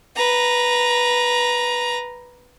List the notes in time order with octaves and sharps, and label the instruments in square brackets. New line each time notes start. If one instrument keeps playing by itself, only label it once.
[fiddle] B4 A#5